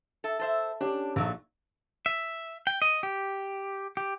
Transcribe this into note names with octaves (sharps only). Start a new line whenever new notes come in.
A4 E5
A4 C5 E5
C#4 D4 G4
A#1 A#2 F#3 A3 D#4
E5
G5
D#5
G4
G4